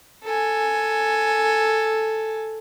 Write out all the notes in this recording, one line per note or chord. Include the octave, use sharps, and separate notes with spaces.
A4 G#5